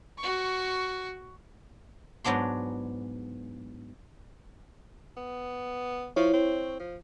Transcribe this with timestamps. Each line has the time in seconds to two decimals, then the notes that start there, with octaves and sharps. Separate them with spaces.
0.18 F#4 C#6
2.24 G#2 F#3 B3 D4 C6
5.17 B3
6.16 F3 E4 C#5
6.33 C4
6.80 F3